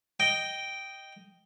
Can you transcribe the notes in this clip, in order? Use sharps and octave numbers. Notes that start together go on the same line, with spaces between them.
D#5 G5